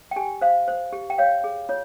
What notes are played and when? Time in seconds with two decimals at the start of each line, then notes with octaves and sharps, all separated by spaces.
0.11 G5
0.16 G4 G#5
0.41 C5 F5
0.68 C5
0.93 G4
1.10 G5
1.18 C#5 F5
1.44 G#4
1.69 F4 C#5